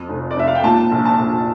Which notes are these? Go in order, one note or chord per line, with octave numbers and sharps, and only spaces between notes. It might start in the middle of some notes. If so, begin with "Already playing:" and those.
Already playing: F2
F1
D5
F1 E5
F5
G5
A#2 A5
A#1
A5
A#1